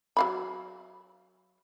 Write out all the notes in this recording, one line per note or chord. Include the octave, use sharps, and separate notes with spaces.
F#3 F5 B5